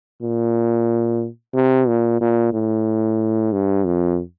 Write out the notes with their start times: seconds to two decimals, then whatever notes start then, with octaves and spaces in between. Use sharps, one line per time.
0.22 A#2
1.54 C3
1.87 A#2
2.21 A#2
2.53 A2
3.52 G2
3.85 F2